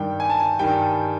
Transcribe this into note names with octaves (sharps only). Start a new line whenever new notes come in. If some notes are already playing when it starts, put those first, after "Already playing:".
Already playing: G2 D#3 G3 G5
G#5
A5
G#5
G2 D#3 G3 G5